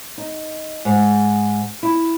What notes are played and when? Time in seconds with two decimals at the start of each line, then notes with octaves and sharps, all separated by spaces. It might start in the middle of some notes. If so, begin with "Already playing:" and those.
0.18 D#4
0.85 G#2
1.83 E4